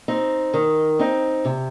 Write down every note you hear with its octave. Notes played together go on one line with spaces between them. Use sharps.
C4 D#4
D#3
C4 D#4
C3